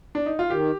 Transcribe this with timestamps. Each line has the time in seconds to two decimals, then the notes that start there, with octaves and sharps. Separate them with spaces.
0.15 D4
0.26 D#4
0.39 F4
0.50 D#3 G4